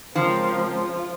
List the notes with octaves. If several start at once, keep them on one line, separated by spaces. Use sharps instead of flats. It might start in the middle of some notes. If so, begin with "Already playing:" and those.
C#3 F3 G#3 C4 F4 A#4